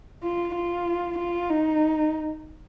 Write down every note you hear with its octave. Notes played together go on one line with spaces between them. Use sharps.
F4
F4
F4
D#4